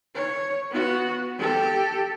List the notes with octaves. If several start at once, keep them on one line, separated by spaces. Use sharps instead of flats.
C#5
B3 F#4
G4 A4